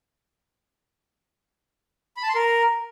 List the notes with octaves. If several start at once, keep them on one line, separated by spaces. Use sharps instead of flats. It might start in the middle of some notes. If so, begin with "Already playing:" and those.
B5
A5
C6
A#4